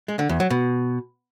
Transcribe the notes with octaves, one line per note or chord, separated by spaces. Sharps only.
G#3
D3
E2
F#3
B2